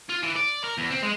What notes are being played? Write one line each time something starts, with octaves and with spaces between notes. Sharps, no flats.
F4
E3
D5
A#4
E2
C4
G#3